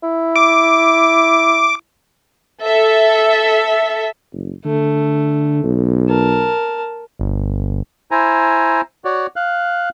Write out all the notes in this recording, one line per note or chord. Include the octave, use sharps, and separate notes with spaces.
E4
D6
A4 E5
F#1
D3 A3
B1
A#4 A5
G1
E4 C5 G#5 A#5
F#4 C#5 D5
F5 F#6